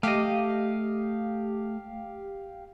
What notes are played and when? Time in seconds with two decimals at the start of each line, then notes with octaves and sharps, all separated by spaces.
0.03 A3 G4 D#5 F5